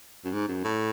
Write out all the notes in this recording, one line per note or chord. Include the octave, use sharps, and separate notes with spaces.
F#2
G#2
F#2
A2